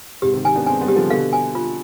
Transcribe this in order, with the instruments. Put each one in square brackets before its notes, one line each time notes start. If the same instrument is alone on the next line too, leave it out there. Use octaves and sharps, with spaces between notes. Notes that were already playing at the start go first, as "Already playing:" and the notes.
[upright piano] G#2 C3 [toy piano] G4
[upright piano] C3 D#3
[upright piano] C3 D#3 [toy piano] G#5
[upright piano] B3 D4
[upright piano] G#3 C4 [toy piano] G#5
[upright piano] G3 B3
[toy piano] G4
[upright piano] D3 F3
[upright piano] B2 D3 [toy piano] F5
[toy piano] G#5
F4